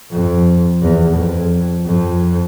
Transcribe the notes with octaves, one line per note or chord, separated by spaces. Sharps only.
F2
E2
F2
F2